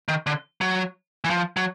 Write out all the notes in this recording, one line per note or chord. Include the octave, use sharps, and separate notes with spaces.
D#3
D3
F#3
E3
F3
F#3